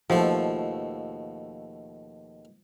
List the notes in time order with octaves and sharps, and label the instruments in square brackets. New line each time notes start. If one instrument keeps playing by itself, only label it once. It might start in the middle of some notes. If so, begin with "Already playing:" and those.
[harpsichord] D#2 B2 A3 [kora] F3